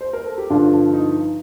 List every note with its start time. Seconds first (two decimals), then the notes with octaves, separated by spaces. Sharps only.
0.01 C5
0.13 A#4
0.25 A4
0.38 G4
0.50 G2 D3 F3 D4 F4
0.93 D#4